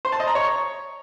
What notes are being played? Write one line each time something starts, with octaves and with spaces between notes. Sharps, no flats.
C5
A5
D#5
A#5
C#5